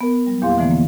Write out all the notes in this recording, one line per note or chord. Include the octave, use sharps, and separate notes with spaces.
B3 A#4
F#3 G3
E2 A#2 A#3 G4 F5 C6
B2 D3 E3 F3 A3 B3
A#3